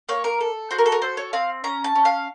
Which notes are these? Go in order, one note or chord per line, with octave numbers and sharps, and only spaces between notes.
A#3 C#5
A#4
A4
F#4 C5
A#4
A4
A#4
A4 C5
C#5
C4 F5
C#4 A#5
A5
C#4
F5